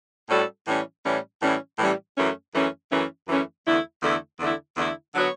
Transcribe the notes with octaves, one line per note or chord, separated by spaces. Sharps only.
A2 G3 C#4 F#4 A4
A2 E3 G3 C#4
A2 E3 G3 C#4
A2 E3 G3 C#4
A2 E3 G3 C#4
F#2 E3 A3 C#4
F#2 E3 A3 C#4
F#2 E3 A3 C#4
F#2 E3 A3 C#4
E2 D3 A3 E4
E2 D3 A3 E4
E2 D3 A3 E4
E2 D3 A3 E4
D3 F#3 B3 F#4 C#5